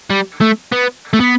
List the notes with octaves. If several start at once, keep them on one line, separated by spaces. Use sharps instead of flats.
G3
A3
B3
A3
B3